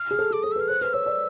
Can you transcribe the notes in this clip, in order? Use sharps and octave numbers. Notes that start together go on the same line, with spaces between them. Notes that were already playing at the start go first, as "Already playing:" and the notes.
Already playing: F6
G#4
A4
G#4 D6
A4 D#6
E6
B4 F6
C5 F#6
B4 F6
C#5 E6
D5